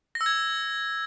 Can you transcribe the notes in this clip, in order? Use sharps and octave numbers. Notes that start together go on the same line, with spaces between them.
A#6
E6
G#6